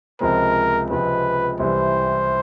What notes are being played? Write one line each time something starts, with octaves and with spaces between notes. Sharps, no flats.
C#2 C3 F3 G#3 C4 A#4
C#2 C3 F3 G#3 C4 B4
C2 C3 E3 G3 C5